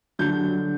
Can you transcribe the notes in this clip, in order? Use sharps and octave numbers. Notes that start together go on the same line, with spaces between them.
D3 F#3 G6